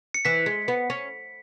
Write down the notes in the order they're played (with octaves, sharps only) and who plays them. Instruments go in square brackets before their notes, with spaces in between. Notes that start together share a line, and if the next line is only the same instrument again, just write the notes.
[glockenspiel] C#7
[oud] E3 [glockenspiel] B6
[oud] G#3
B3
C#4